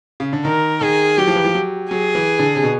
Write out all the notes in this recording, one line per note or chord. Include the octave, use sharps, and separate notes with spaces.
C#3
D3
D#3 A#4
D#3 G#4
F#3 G4
F3
E3
F3
F#3
F#3 G#4
E3
D3
C3
B2